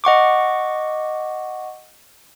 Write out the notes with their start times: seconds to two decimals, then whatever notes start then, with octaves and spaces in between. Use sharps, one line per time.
0.04 D#5 F#5 C#6 D6